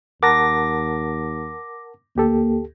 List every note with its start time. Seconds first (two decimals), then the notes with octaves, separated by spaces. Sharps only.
0.23 D#2 A#4 F#5 A5 D6 A#6
2.16 D2 A#3 G4 A4